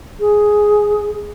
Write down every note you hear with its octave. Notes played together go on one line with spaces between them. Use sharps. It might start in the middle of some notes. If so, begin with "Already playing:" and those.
G#4